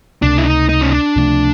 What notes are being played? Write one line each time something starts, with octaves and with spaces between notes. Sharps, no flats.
C#2 C3 F3 A3 D4
E4
D#4
D#4
C#4
D4
C#2 C3 F3 A3